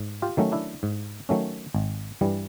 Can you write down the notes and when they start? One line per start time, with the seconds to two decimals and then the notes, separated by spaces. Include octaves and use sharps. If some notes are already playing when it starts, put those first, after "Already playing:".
Already playing: G#2
0.22 F4 G4
0.37 D#3 F#3 A3 C#4
0.52 D4 E4
0.83 G#2
1.29 D#3 F#3 A3 C#4
1.74 G#1
2.21 G2 E3 G3